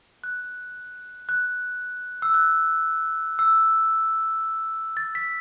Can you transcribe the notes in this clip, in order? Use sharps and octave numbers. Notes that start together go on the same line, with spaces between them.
F#6
F#6
E6
F#6
E6
A6
B6